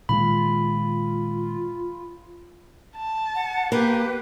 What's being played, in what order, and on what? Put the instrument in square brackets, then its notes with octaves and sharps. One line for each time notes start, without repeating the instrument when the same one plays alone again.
[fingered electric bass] A#2 D#3 G#3 [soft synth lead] F4 [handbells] B5
[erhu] A5
[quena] F#5
[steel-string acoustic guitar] A#3 [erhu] G4 [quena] B4